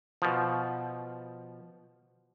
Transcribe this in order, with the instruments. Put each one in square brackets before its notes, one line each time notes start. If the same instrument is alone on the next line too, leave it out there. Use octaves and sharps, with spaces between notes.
[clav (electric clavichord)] B2 F3